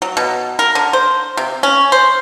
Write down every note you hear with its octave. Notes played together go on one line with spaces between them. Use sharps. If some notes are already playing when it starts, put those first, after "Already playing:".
F#3
B2
A#4
D3
C5
C3
C#4
C5